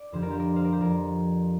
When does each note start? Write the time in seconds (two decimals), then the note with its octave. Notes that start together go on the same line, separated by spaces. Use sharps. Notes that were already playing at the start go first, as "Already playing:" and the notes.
Already playing: D5
0.12 F2 D3 F3 G4 C5
0.22 F4 A#4
0.30 G4 C5
0.39 A#4 D5
0.56 C5 F5
0.64 A#4 D5
0.72 G4 C5
0.81 F2 F3 F4 A#4